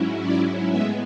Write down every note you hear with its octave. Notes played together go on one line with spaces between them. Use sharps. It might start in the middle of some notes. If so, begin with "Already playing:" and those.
Already playing: G#2 F#3 C#4 E4
D5
A2 G#3 B3 E5